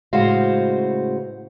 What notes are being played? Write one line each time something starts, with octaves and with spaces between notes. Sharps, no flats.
A2 C#3 G#3 F#4 C5 F5